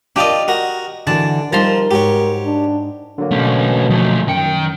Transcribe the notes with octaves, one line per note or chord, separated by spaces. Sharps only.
D4 F4 G4 D5 D#5
F#4 A#4
D3 E3 D4 F#4 A5
F3 G3 D#4 A#4 A5 A#5 C6
G#2 F#4 G4 C#5
D4
D3 F#3 A#3
B2 A3 C#4
F3 A3
F#2 D#3 G5 C#7